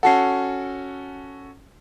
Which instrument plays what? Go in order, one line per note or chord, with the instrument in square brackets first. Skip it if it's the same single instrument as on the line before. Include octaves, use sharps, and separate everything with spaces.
[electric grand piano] C#4 F#4 A4 [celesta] F#5 A5 C7